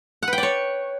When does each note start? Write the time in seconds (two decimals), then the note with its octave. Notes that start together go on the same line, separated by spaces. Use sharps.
0.23 F#5
0.28 B4
0.33 G5
0.38 D5
0.43 C#5